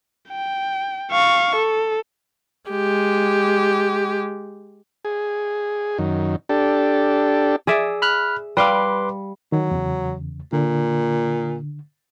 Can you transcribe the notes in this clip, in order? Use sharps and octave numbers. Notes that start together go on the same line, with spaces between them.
G5
F5 C#6
A4
G#3 G4
G#4
F#2 D#3
D4 G4 A4
G#4 D5 E5
B5 F6 F#6
G3 B4 F5 C6 D6
D#3 F#3
E2 C#3
A#2 D3